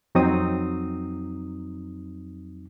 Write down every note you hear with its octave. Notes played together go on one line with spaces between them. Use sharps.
F2 F#3 C4 D#4 D#6